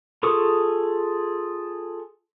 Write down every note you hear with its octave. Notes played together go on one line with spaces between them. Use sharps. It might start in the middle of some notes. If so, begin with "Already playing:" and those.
F4 G#4 A4 C#6 D#6